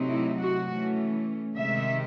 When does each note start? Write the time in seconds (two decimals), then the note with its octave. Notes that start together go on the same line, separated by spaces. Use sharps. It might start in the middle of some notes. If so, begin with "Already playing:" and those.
Already playing: C3 F#3 A3 C4 D#4
0.09 E4
0.38 F#4
0.67 E3 A3 C#4
1.55 C3 D#3 G#3 E5